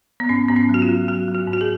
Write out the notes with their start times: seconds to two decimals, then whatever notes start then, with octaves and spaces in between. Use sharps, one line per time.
0.20 B3
0.29 G#2 C#4
0.49 G#2 B3
0.56 C#4
0.69 F#3 F#4
0.82 F4
0.89 F#3
1.08 F#3 F#4
1.28 F#3
1.35 F#4
1.48 G#2
1.53 F#4
1.61 G#4